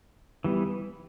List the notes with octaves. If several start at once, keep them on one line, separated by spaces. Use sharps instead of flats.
E3 G3 B3